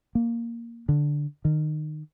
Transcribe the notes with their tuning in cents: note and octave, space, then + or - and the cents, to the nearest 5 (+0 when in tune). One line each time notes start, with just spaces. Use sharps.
A#3 +0
D3 +0
D#3 -25